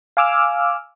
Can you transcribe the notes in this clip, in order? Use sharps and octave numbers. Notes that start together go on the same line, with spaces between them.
F5 G#5 D6 E6 F6